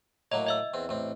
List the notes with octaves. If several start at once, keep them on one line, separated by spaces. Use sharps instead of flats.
A2 F#3 A#3 D#5
D#5 E5 E6
E2 C4
A1 C4